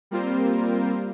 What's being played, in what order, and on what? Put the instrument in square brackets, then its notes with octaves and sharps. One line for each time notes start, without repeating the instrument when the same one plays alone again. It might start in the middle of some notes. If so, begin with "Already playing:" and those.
[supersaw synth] G3 A#3 C4 F4 A#4 C5